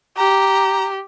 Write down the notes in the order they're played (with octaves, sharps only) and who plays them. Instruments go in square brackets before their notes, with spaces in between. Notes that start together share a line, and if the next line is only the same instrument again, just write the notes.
[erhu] G4 [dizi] A#5